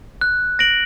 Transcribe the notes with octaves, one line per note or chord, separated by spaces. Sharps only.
F#6
A#6 D7 F#7